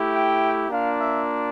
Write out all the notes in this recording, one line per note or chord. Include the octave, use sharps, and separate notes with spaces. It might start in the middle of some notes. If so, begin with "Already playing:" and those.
Already playing: A3 E4 G4
G5
A#3 D4 F4 F5
E5